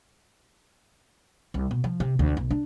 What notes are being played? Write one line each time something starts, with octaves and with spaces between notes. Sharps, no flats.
C2
B2
F3
C3
D2
B1
D4